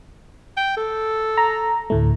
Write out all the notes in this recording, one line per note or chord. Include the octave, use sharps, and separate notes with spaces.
G5
A4
A#5
D2 A2 A3